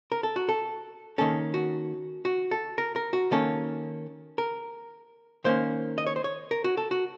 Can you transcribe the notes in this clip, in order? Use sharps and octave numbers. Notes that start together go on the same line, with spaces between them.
A#4
A4
F#4
A4
D#3 A#3 C#4 A4
F#4
F#4
A4
A#4
A#4
F#4
D#3 A#3 C#4 A4
A#4
D#3 A#3 C#4 C5
D#5
C#5
C5
C#5
A#4
F#4
A4
F#4